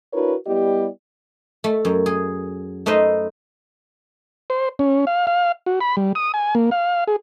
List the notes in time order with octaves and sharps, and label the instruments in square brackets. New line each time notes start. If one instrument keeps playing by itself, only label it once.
[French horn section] D4 E4 F#4 A#4 B4 C#5
G3 B3 E4 G4 D5 D#5
[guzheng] A3
F#2
G#4
A3 D#4 B4 C5 D#5
[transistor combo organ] C5
C#4
F5
F5
F#4
B5
G3
D#6
G#5
A#3
F5
G#4